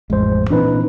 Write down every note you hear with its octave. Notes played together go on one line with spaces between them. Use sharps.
A1 F2 G#3 C5
A#2 E3 C4 D4 D#4 B4